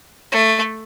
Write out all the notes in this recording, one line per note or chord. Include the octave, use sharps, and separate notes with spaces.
A3